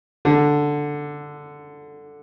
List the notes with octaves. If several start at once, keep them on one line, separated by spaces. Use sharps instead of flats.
D3